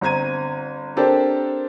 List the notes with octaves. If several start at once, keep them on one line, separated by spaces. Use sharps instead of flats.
G1 C4 A#5 G#6 D#7
C4 D4 G4 A4 A#4 C5